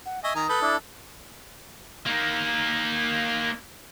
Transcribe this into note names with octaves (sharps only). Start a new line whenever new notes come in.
F#5
D#5 E5 G#5 C#6
D#3 A#5 D#6
A4 B4 B5 G6
D4 E4
A#3 D#4